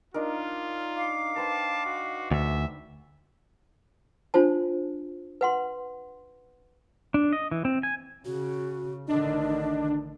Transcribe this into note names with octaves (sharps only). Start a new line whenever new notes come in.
D4 D#4 F4 A#4
F5 D6
B4 C5 G5 A5
F#4
D2 E5
D4 F4 C5 A5
B4 F#5 C6
D4
D#5
E3
C4
G#5
C#3 F#4
A1 D3 D#3 D4 D#5